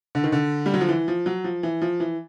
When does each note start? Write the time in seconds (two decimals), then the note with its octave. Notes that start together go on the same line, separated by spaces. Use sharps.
0.15 D3
0.24 D#3
0.32 D3
0.66 G3
0.74 F#3
0.81 F3
0.89 E3
1.08 F3
1.26 F#3
1.44 F3
1.63 E3
1.82 F3
2.00 E3